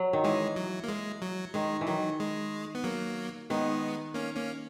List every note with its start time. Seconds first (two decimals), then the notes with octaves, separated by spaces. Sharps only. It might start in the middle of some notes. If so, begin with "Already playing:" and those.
Already playing: F#3
0.13 D#3
0.24 E3 G#3
0.56 F#3
0.84 A#3
0.89 G#3
1.22 F#3
1.54 D#3 G#3
1.81 E3
1.87 D#3 F#3
2.20 G#3
2.75 B3
2.84 F#3 A#3
3.50 D#3 G#3 B3
4.14 A#3 C#4
4.36 A#3 C#4